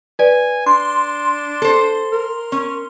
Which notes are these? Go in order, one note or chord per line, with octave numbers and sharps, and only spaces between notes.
B4 D5 G#5
D4 C6
A4 C5
A#4
C#4